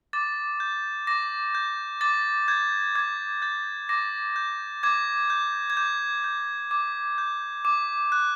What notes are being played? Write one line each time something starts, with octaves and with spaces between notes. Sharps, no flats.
D6 A6
G6
D6 A#6
G6
D6 A6
G6 G#6
D6 G#6
G6 A6
D6 A#6
G6
D6 G#6
G6
G#6
D6 G6
G6
D6 G#6
G6
D6
F#6